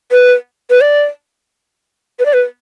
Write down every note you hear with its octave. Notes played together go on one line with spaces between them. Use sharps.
B4
B4
D5
B4
D5
B4